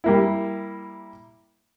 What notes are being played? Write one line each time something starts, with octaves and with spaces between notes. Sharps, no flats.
G3 A#3 E4